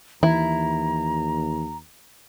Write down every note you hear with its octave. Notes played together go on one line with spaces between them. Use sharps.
D#2 E3 E4 A#5